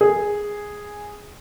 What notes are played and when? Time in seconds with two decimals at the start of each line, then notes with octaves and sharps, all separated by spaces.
0.01 G#4